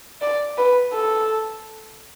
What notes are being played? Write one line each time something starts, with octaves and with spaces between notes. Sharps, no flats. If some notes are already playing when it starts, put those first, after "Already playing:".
D5
B4
A4